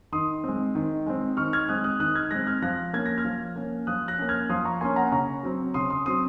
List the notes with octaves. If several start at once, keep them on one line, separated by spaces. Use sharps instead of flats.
D#3 C6 D#6
G#3 C4
D#3
G#3 C4
D#3 C#6 F6
F6 G#6
G#3 C4 D#6 F#6
D#6 F#6
D#3 D#6 F#6
F6 G#6
G#3 C4 F#6 A#6
F6 G#6
F3 F#6 A#6
A#3 C#4 G#6
A#6
F6 G#6
F3
A#3 C#4
F3 D#6 F#6
F#6 A#6
A#3 C#4
F6 G#6
F3 C6 D#6
A#5 C#6
A#3 C#4 G#5 C6
F#5 A#5
C#3 A#5 C#6
F#3 C4
C#3 C6 D#6
C6 D#6
F#3 C4 C6 D#6